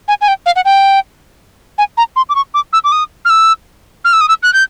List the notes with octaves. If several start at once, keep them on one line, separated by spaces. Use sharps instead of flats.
G#5
G#5
G5
F5
F#5
G5
G#5
A#5
C6
D6
C#6
D6
E6
D6
D#6
F6
E6
F6
E6
D#6
E6
F#6
G6